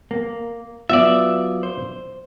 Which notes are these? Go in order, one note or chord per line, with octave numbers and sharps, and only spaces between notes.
A#3
F#3 B3 F4 D5 E5
C5